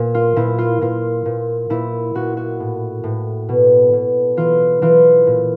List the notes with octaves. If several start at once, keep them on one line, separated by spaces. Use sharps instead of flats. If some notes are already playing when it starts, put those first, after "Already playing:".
Already playing: A#2
F4
A#2 E4
F4
A#2 F4
A#2
A#2 E4
A#2 F#4
F#4
A2
A2
B2
B2
E3 F4
E3 F4
A#2